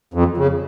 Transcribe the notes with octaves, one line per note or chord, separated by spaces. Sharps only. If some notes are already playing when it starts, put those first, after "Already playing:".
F2
C#3